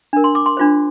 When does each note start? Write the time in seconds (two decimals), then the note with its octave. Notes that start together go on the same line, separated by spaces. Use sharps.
0.13 D4 A#4
0.24 C6
0.35 D6
0.46 C6
0.57 D4 F4 C5